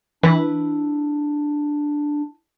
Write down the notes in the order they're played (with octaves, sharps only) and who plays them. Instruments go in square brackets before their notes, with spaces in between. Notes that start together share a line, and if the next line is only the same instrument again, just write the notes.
[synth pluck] E3 [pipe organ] D4 [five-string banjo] E4 B4